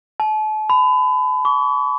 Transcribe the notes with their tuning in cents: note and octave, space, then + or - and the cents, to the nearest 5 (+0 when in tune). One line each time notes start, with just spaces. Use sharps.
A5 -40
B5 +30
C#6 +45